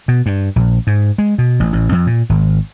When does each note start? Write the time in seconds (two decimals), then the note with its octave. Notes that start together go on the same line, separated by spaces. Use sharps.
0.08 B2
0.26 G2
0.56 A#1
0.87 G#2
1.18 G#3
1.38 B2
1.60 A1
1.73 A1
1.92 F2
2.07 A#2
2.29 G#1